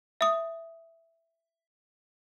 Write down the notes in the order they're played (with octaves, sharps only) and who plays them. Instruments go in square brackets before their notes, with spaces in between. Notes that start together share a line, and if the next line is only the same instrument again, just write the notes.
[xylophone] E5 D#6